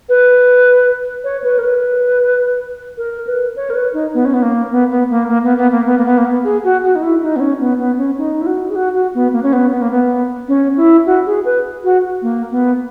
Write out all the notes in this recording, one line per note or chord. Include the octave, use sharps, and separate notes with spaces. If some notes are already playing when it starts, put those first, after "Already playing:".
B4
C#5
B4
A#4
B4
A#4
B4
C#5
A#4
B4
D#4
B3
C#4
B3
A#3
B3
B3
A#3
A#3
B3
B3
A#3
B3
A#3
B3
A#3
B3
G#4
F#4
F#4
D#4
E4
D#4
B3
C#4
B3
B3
C#4
D#4
E4
F#4
G#4
F#4
F#4
B3
A#3
C#4
B3
B3
A#3
B3
C#4
E4
F#4
G#4
B4
F#4
A#3
B3